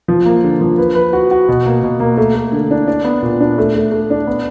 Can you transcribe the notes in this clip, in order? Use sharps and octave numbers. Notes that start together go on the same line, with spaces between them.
F3
A#3
D3
F3
B4
B4
F#4
F#4
B2
A#3
B2
A#3
A3
A3
D3
D4
D4
B3
A#2
D4
A3
A3
A3
D4
B3